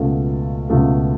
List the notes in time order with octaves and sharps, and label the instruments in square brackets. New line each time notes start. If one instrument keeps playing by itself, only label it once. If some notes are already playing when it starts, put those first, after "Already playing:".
Already playing: [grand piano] C#2 B2 A3 F4 A4
C#2 B2 A3 F4 A4